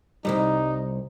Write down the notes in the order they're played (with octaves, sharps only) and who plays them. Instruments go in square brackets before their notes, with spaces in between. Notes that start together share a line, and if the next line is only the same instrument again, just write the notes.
[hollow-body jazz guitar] C2 G#2 G3 [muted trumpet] D#4